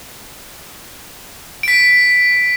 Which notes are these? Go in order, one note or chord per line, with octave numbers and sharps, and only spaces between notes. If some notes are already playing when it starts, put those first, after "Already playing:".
B6 D7